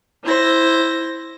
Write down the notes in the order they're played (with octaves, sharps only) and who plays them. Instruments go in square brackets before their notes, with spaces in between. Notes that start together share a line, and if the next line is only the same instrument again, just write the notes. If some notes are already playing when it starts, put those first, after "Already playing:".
[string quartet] E4 C5 A#6